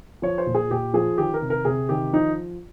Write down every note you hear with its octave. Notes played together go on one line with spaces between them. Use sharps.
F3 C#5
C5
A#2
G#4
A#2 G4
F3 G#4
D#3 G4
A#4
C3
A#4
C3 G#4
D#3 G4
F3 D#4